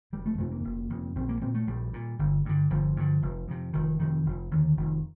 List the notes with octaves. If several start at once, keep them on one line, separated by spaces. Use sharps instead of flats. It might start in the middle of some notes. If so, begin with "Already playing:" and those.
F1 G3
A3
F2 C3 A3
A#3
F1
F2 C3
A#1 C4
A#3
A#2 C4
A3
A#1 G3
A#2
G1
G2 D3
G1 F3
G2 D3
F1
F2 C3
F1 D#3
F2 C3 D#3
F1
D#2 D3
F1 D#3